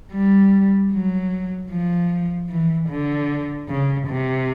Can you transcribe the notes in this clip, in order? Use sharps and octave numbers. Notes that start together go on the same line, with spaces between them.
G3
F#3
F3
E3
D3
C#3
C3